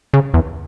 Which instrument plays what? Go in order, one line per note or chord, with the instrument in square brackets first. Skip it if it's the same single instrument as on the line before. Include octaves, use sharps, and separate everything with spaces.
[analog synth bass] C#3
E2